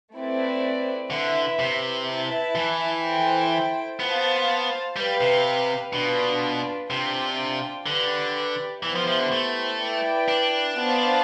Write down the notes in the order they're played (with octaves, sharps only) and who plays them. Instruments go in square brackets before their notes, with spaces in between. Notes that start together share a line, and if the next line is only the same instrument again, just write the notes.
[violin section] A3 C4 E4 B4 D5
[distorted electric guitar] D3 [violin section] E4 B4 E5
[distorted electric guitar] C3
[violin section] E4 B4 E5 A5
[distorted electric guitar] E3
[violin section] E4 A4 C5 G5
[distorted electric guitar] B3 [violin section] F4 C5 F5 A5
[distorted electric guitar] G3 [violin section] G4 B4 F5
[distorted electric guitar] C3
[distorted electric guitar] B2 [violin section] D4 F4 B4
[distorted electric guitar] C3 [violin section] D4 F4 C5 G5
[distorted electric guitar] D3 [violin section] G4 B4 D5
[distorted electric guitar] E3 [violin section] B3 E4 G4 C5
[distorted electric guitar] F3
F3
D3
A3
[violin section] E4 B4 D5 G5
[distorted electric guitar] D4
[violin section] B3 F4 C5 F5 A5